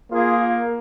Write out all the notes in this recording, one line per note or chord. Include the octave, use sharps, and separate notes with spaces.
A#3 F4 G#4